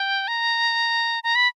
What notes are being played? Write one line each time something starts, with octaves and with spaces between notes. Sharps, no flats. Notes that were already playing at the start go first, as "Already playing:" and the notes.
Already playing: G5
A#5
A#5
B5